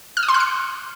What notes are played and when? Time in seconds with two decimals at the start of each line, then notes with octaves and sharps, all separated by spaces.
0.17 F6
0.23 D#6
0.28 C6
0.34 F#6
0.40 C#7